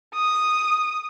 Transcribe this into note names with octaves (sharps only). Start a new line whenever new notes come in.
D#6